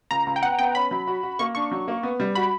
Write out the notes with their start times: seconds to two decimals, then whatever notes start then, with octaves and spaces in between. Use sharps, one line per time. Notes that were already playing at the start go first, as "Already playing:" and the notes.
0.11 C#2 A#5
0.27 C#2
0.36 G5
0.43 B3 F#5
0.59 B3 G5
0.75 C#4 B5
0.91 F#3
1.07 F#4
1.23 F#4
1.39 A#3 C#6
1.55 D4 C#6
1.71 F#3
1.88 A#3
2.03 B3
2.20 G3
2.35 F#4 B5